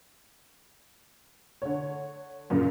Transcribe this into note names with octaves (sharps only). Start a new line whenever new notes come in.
D3 C#5
F#2 A#2 C#3